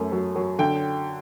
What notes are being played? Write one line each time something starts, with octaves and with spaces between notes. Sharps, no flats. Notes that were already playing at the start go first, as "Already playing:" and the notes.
Already playing: F#2 A3
F#3
F#3
D3 G5